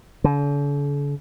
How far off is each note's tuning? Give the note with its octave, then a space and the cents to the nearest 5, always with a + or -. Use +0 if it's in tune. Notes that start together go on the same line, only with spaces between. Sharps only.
D3 -45